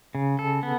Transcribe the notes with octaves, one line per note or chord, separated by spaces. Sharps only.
C#3
A4
B3